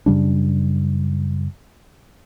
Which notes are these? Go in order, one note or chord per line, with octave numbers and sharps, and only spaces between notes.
F#2 C#3 G3 D4